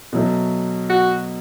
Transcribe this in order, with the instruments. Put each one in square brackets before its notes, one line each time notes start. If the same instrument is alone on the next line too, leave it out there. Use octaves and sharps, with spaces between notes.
[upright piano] B2 F#3 A3
[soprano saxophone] F#4